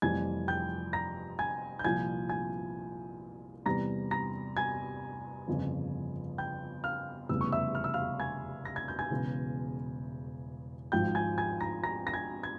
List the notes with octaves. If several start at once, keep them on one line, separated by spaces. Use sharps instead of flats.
F1 F2 E3 G3 G#5 G#6
G5 G6
A#5 A#6
G#5 G#6
G6
C2 A#2 F3 G#5 G#6
G#5 G#6
E2 C3 G3 A#5 A#6
A#5 A#6
G#5 G#6
G1 F2 C#3
G5 G6
F5 F6
F1 E2 C#3 G3 E6
C#6
E5 E6
F6
E6
F5 F6
G#5 G#6
A#6
G#6
G6
G#5 G#6
E1 E2 C#3
G#1 G#2 F3 G5 G6
G#5 G#6
G#5 G#6
A#5 A#6
A#5 A#6
A#6
G#5 G#6
G#6